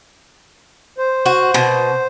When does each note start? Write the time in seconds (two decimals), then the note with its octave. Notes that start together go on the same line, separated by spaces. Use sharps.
0.98 C5
1.26 F#4
1.54 B2